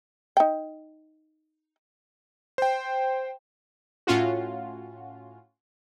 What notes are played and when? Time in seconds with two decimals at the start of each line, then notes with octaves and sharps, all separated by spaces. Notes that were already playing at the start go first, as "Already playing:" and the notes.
0.37 D#4 G5
2.58 C5 G5
4.07 A2 C#4 F4 F#4